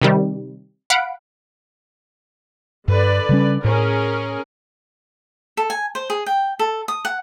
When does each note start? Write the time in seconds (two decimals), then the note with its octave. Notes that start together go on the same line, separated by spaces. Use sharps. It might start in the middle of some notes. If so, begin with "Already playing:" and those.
0.02 C3 D#3 G3
0.90 F5 F#5 B5 D7
2.88 G2 D3 B4 D5
3.29 C#3 G3 C#4
3.64 A2 C#4 G#4 A#4
5.57 A4
5.70 G#5
5.95 C5
6.10 G#4
6.26 G5
6.59 A4
6.88 D#6
7.05 F#5